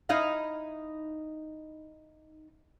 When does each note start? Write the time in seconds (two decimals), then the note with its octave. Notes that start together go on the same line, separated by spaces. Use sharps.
0.09 D#4 E4 F5